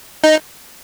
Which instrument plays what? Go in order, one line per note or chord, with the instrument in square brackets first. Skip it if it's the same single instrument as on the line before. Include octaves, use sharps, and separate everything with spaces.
[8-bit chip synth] D#4